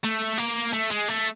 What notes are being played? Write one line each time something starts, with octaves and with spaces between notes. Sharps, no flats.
A3
A#3
A3
G#3
A3